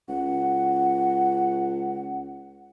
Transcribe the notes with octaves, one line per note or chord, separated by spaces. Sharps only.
C#2 F#5